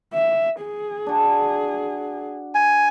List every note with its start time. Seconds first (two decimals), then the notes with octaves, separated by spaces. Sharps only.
0.13 E5
0.61 G#4
1.06 D4 F#4
2.55 G#5